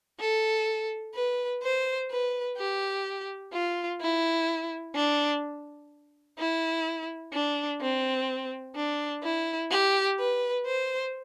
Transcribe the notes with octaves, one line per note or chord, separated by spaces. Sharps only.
A4
B4
C5
B4
G4
F4
E4
D4
E4
D4
C4
D4
E4
G4
B4
C5